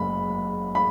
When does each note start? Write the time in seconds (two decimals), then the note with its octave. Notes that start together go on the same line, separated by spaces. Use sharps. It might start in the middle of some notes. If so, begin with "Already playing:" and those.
Already playing: F#1 G#3 B5
0.75 B5